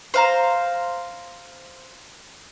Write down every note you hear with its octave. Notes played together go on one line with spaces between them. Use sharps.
C5 F5 A#5